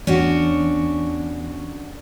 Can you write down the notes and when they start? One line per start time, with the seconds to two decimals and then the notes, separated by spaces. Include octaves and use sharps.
0.07 E2 C#4 D4 F#4